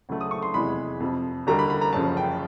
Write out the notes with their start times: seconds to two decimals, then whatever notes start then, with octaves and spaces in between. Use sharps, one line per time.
0.09 D2 C#3 F#3 A3
0.21 D#6
0.31 C#6
0.43 C6
0.54 F1 E2 C3 E3 G#3 B5
1.00 F2 C3 F3
1.47 D#2 D3 G3 A#3 A#5
1.59 B5
1.70 B5
1.81 A#5
1.93 F#1 F#2 C#3 F3 A5
2.17 G5